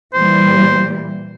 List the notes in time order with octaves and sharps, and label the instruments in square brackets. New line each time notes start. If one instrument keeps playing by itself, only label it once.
[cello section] A#2 E3 G3 [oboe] C5